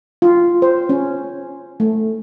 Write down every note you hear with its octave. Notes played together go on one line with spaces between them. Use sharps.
F4
C5
C#4
A3